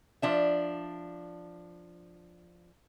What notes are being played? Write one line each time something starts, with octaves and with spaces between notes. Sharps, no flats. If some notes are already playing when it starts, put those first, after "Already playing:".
F3 D4 E5